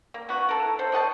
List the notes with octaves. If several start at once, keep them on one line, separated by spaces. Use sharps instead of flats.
A#3
B3 F#4
A4 A#4
E4
A4 C5
C#5 D#5 F#5 A5